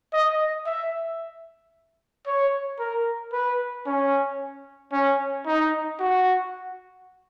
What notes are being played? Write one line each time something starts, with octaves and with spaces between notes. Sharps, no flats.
D#5
E5
C#5
A#4
B4
C#4
C#4
D#4
F#4